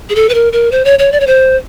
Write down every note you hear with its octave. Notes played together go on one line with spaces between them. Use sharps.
G#4
A4
B4
A#4
A#4
C5
C#5
C#5
D5
C#5
C5